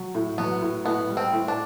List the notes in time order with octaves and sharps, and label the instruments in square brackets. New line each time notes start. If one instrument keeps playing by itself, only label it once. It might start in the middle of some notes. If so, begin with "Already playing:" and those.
Already playing: [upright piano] F#3
A2
[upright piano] F#3 [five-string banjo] B3
[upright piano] A2
[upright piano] A2 [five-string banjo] B3
[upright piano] G3
[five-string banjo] C4
[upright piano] A2
[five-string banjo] D4